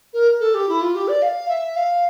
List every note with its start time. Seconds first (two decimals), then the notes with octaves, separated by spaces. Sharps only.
0.13 A#4
0.40 A4
0.54 G4
0.68 E4
0.81 F4
0.95 G4
1.08 D5
1.22 F5
1.48 E5
1.76 F5